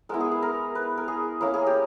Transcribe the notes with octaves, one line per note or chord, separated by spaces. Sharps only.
G#3 B3 E4 A#4
G#4
G#4
A#4
B4
A#4
G#4
A#3 C#4 E4 A#4
G#4
G4